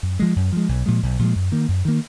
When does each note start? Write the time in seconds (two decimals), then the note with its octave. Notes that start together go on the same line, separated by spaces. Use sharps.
0.03 F#2
0.19 F3 G#3
0.36 F#2
0.52 F3 G#3
0.69 B1
0.86 A#2 F3 G#3
1.03 B1
1.19 A#2 F3 G#3
1.35 F#2
1.52 D#3 A#3
1.68 F#2
1.85 D#3 A#3